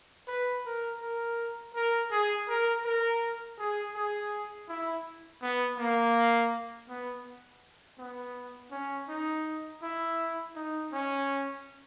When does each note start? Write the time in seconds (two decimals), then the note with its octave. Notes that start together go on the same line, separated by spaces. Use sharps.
0.28 B4
0.65 A#4
1.01 A#4
1.75 A#4
2.11 G#4
2.48 A#4
2.85 A#4
3.58 G#4
3.95 G#4
4.69 E4
5.42 B3
5.78 A#3
6.89 B3
7.99 B3
8.71 C#4
9.09 D#4
9.82 E4
10.56 D#4
10.92 C#4